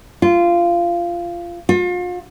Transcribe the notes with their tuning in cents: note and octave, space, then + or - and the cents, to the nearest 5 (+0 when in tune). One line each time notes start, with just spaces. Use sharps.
F4 -15
F4 +40